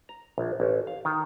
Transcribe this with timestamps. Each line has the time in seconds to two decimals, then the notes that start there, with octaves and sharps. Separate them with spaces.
0.09 A#5
0.38 A#1
0.60 A1
0.87 F5
1.05 D#3